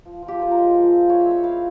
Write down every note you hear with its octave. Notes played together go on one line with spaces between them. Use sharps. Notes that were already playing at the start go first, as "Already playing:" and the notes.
F3
F3
G4
F4 C5
A#4
G#3
F3
C4
F4 C#5
E5
C4
C#5
E4 F5